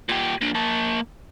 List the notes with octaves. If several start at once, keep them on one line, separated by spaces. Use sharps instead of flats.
A#2 G4
A#3 D4
A#3 A5